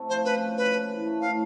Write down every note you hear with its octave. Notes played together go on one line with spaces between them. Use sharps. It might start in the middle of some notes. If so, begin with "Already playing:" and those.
Already playing: C3 A3
F3 C5
C#4 B4
F3
F3 B4
A#3
E3
A3
A2 F5